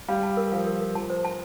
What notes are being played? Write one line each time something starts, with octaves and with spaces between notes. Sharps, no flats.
G3 F5
A5
A#4
F3 F5
A#4
A#4
F3 A5
C5
A5